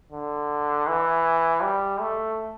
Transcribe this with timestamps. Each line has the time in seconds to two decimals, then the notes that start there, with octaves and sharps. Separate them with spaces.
0.12 D3
0.87 E3
1.62 G3
2.00 A3